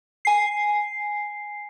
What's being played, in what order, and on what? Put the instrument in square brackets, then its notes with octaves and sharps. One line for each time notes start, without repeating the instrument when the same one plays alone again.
[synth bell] G#5 C7